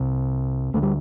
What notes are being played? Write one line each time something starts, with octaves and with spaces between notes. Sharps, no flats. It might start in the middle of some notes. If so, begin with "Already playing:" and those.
Already playing: C2 C3
D2 D3 A3
G3